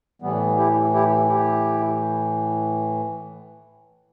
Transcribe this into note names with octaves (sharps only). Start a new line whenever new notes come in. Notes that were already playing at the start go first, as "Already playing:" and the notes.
A2 E3 G3 B3
E4 G4
E4 G4
E4 G4